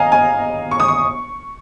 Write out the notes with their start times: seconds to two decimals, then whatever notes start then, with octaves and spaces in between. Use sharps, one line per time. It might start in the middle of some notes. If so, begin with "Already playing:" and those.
Already playing: D#5 F5 G#5 A#5
0.12 G#5
0.71 C#6
0.80 D#6
0.88 C#6